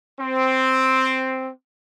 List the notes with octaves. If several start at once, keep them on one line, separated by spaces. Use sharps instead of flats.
C4